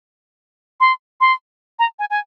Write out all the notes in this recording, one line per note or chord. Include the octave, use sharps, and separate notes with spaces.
C6
C6
A#5
G#5
G#5